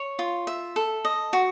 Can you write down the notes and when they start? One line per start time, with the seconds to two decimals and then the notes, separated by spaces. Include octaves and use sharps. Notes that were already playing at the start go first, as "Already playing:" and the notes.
Already playing: C#5
0.19 F4
0.47 E5
0.76 A4
1.05 D#5
1.33 F#4